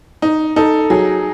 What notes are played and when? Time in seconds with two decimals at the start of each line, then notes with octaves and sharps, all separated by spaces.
0.22 D#4
0.56 D#4 A4
0.90 F#3 G#4